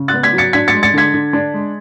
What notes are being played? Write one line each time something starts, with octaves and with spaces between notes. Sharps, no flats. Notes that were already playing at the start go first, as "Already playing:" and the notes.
Already playing: C#3
F#6 A6
B3
G#6 B6
F#3
A6 C#7
D4 G#6 B6
A6 C#7
G#3
A6 C#7
D3 G#6 B6
D3
D4
G#3